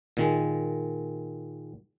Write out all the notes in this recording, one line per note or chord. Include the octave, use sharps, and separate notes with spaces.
A#2 D#3 G#3